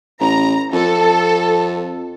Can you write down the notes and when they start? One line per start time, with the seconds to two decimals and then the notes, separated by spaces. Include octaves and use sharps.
0.21 A1 A#5
0.73 F2 A4